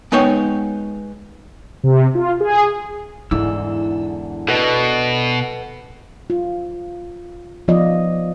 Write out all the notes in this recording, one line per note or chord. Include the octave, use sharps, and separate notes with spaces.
G#3 B3 D#4 C#5 G5
C3
F4
G#4
E2 G#2 D3 E4 E6
B2 B3 D4 A4 B4 D#5
F4
F3 B3 F4 D5 D#5